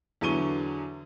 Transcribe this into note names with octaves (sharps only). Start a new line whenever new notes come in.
E2 D3 F#3 C#6 D#7 G7